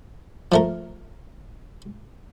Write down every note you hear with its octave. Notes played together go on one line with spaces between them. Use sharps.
F3 A3 A#4